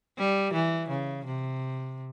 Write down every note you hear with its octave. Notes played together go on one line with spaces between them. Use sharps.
G3
E3
C#3
C3